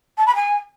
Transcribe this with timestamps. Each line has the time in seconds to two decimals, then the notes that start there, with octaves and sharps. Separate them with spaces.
0.17 A5
0.26 B5
0.35 G#5